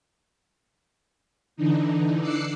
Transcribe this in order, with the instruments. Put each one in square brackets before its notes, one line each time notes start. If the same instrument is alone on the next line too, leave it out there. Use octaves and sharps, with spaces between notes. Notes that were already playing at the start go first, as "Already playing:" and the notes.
[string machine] D3 E3 D4 D#4
D6 E6 F#6 C7 C#7